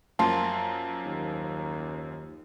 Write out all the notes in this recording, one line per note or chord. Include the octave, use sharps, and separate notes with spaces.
F#2 F3 A#3 F4 A5
D#2